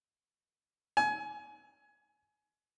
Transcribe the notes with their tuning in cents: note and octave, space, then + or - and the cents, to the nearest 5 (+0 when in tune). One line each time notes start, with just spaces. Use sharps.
G#5 +25